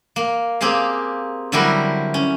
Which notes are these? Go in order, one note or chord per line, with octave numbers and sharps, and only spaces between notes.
A#3
A#3 C4 G4 G#4 F5
D3 F#3 G3 E4 G4 A#4
C#4